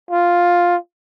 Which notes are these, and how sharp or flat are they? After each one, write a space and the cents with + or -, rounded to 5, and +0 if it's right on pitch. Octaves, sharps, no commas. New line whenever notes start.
F4 +5